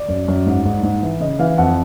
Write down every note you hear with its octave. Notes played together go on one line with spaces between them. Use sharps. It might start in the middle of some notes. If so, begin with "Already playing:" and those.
Already playing: D5
F#2
F#2
G#2
G#2
G#2
E3
C#3 D#5
E3 F5
F2 F#5